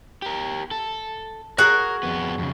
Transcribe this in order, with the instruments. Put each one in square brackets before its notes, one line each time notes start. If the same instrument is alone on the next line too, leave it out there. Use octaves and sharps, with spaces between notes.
[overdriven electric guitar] G4 A#4
A4
[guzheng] F#4 G#4 F#5 [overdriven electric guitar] A#4 A#5
[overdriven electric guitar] F2 B3
F2 C#3